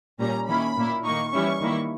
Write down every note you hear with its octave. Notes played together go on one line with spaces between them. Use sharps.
A#2 G3 C#4 A#5
D#3 A#3 C#4 E4 B5
A#2 A#3 E4
D#3 A#3 D#4 C#6
E3 G3 C#4 E4 C#6
D#3 G3 A#3 E4